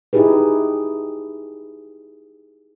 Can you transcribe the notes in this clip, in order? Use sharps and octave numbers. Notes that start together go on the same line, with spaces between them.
D#4 E4 G4 G#4 B4